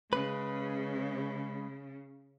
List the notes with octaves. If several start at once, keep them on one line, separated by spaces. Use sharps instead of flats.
C#3 G#3 B4